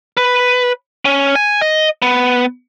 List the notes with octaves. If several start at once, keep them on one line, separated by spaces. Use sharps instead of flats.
B4
C#4
G#5
D#5
B3